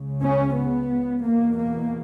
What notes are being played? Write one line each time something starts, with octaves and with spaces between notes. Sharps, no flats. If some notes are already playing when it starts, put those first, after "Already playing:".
Already playing: C#2 C#3
C#4
B3
E2 B2 A#3
A#3